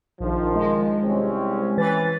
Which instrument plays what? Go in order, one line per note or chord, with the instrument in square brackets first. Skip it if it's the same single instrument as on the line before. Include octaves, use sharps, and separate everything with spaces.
[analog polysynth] A#1 [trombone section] D#3 F3
[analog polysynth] G#3
[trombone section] C2 C4 C#4
[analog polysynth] E3 B4 A6